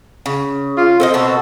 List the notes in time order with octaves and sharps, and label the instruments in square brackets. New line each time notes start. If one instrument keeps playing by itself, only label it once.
[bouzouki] C#3
[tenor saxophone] F4
[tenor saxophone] C4 [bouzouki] A4 C5 D#5
[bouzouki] B2 F#4 A4